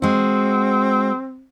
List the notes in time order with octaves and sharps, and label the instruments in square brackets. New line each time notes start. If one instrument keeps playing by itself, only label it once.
[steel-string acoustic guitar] G#3 F#4 [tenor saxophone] C4